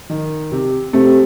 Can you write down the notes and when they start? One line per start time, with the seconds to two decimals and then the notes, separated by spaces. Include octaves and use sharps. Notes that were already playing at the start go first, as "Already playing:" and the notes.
0.10 D#3
0.51 C3
0.93 C3 A3